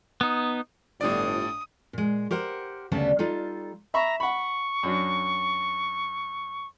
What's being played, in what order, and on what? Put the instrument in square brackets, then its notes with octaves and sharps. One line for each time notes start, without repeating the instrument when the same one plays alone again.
[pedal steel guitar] B3 D#4
[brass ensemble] G1 [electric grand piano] A2 D4 D5 [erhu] D#6
[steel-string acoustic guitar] A#2 G#3
G4 A#4 C5 F#5
D2 C#3 G3 B3 B4 A5
G3 D#4 F4 A4
[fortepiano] E5 B5 C#6 [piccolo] A#5
[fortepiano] F#5 B5 [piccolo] C#6
[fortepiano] F#2 F#3 D4